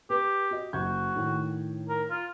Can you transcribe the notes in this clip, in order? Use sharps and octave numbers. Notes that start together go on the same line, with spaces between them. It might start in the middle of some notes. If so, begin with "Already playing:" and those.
G4 B4
F#4 D#5
F#1 F#4 G6 G#6
A2 D#3
A#4
F4